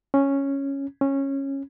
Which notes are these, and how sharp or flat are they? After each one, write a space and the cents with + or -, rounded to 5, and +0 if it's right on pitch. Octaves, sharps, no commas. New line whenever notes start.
C#4 -5
C#4 -15